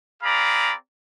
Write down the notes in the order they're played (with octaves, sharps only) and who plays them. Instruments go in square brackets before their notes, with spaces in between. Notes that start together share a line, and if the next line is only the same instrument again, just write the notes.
[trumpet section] C4 G#4 D5 F5 A#5 B5